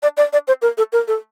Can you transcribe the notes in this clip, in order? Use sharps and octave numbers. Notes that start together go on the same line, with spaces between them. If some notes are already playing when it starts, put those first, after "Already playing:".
D5
D5
D5
C5
A#4
A4
A#4
A4